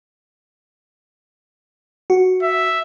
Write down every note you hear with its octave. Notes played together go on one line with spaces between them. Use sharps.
F#4
E5